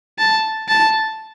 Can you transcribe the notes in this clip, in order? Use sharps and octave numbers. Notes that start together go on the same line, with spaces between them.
A5
A5